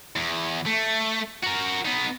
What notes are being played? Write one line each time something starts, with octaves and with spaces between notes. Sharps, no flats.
E2
A3
F#4 A#4
B3 D#4